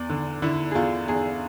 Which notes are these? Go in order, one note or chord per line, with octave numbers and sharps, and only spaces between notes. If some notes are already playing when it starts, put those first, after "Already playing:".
Already playing: E2 D5
D3
D3 E4
G#4
E2 F4
E2 G#4